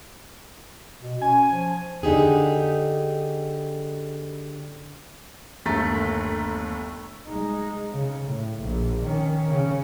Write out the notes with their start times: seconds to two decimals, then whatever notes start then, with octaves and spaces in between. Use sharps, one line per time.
1.01 B2
1.22 C#4 G#5
1.51 F3
2.03 D3 D#4 G4 G#4
5.65 G1 D#2 A3 A#5 A6 B6
7.27 G#3 D#4
7.92 C#3
8.26 A2
8.61 A#1
9.03 D#3 C#4
9.49 C#3 C#4